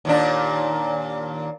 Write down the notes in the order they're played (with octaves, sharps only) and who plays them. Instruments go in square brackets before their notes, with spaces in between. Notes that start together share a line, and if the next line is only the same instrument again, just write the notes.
[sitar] D#2 A#2 D4